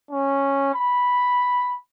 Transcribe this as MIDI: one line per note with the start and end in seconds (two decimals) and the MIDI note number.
0.11 0.73 61
0.75 1.75 83